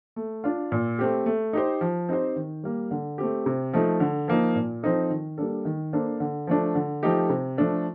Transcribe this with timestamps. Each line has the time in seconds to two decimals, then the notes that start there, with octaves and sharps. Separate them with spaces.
0.16 A3
0.44 D4 F4
0.72 A#2
0.99 A3 C4 G4
1.26 A3
1.53 D#4 G4 C5
1.81 F3
2.09 C4 D#4 G4 C5
2.36 D#3
2.64 G3 A#3
2.91 D3
3.18 A3 C4 G4
3.46 C3
3.73 F3 A3 D#4
4.00 D3
4.28 F3 A#3 D#4
4.55 A#2
4.83 F3 C4 D#4 A4
5.10 D#3
5.38 G3 A#3 D4 A4
5.65 D#3
5.93 A#3 D4 A4 C5
6.20 D3
6.47 F3 A3 D4
6.75 D3
7.03 F3 A3 D#4 G4
7.30 C3
7.58 F3 A3 D4 A4